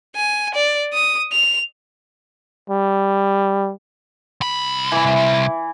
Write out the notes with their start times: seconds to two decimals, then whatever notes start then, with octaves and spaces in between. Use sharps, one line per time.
0.16 G#5
0.55 D5
0.93 D#6
1.32 F7
2.70 G3
4.41 C2 B5
4.92 E3